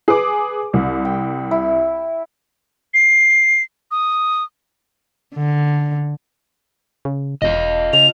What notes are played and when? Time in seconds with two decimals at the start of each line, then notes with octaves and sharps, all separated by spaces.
0.08 G#4 B4 D6
0.73 C2
1.05 G5
1.51 E4
2.94 C7
3.91 D#6
5.35 D3
7.05 C#3
7.42 E1 F4 D#5
7.93 C#3 F7